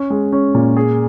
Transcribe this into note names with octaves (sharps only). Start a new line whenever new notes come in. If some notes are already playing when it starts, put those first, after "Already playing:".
Already playing: C#4
G#3
C#4
A#2
G#4